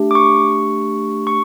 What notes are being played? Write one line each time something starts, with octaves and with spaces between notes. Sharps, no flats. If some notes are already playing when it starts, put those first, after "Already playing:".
Already playing: A3 D4 G4
D6
C#6
C#6